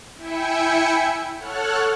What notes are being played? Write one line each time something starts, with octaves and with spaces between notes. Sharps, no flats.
E4 E5 G5 G#5 C#7
A4 C#5 F#5 F6 F#6